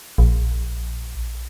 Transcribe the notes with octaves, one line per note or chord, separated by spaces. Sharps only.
A#1